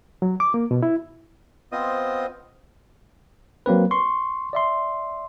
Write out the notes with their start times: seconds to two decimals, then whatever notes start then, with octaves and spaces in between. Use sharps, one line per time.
0.22 F#3
0.40 D6
0.54 A#3
0.71 B2
0.83 E4
1.72 B3 C4 F4 C5 D#5 D#6
3.66 F#3 A#3 C4 B4
3.91 C6 C#6
4.53 D5 E5 C6